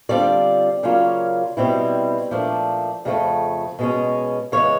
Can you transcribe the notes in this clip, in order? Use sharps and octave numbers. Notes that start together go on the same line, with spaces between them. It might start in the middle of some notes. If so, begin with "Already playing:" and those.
D3 G3 C4 F4 D5
C#3 F#3 A#3 C#4 F4
B2 G3 C4 E4
A#2 F3 A3 D4
F2 C#3 F3 A3
B2 G#3 C#4
C#3 E3 G#3 C#5